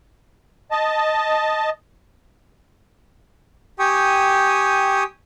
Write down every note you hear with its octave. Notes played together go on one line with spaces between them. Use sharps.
D#5 A5
G4 G5 G#5 C#6 D#6